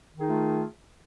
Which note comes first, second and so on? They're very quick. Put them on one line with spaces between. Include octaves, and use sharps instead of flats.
D#3 G#4 D#4 A3 F4